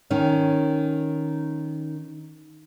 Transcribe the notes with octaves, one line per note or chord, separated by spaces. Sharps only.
D#3 C#4